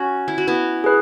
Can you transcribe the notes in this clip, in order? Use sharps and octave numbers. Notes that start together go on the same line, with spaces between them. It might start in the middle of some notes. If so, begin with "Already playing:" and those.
Already playing: C#4 F#4
E4
F#4
B3 E4
G#4 B4